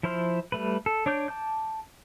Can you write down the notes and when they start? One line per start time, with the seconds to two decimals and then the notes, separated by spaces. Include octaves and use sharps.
0.03 F3 E4 C5 C6 F6
0.52 G3 A3 B4
0.86 A4
1.06 D4 C#5 D6 G6
1.28 A5 D6 G6